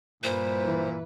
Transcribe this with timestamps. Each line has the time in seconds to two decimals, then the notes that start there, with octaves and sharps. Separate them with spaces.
0.23 G2 A#2 E4 B4 C5
0.66 E3